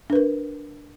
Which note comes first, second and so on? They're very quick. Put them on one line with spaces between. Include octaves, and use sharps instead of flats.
D4 B4 A#4